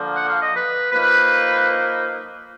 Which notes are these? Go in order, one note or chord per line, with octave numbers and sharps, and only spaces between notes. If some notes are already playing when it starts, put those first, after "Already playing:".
Already playing: D3 F3 A#3
F#5
F5
D#5
B4
F3 A#3 D#4 B4